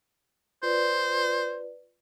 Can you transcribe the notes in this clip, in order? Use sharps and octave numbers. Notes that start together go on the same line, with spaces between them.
F4 B4 C5 D5